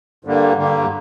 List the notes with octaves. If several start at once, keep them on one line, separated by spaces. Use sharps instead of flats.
G2 D3 G3 A#3
G2 D3 G3 A#3